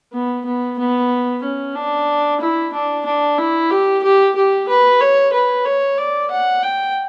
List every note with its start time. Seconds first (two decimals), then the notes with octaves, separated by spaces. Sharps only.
0.13 B3
0.45 B3
0.79 B3
1.43 C#4
1.75 D4
2.40 E4
2.73 D4
3.06 D4
3.38 E4
3.70 G4
4.03 G4
4.36 G4
4.68 B4
5.00 C#5
5.33 B4
5.65 C#5
5.98 D5
6.31 F#5
6.63 G5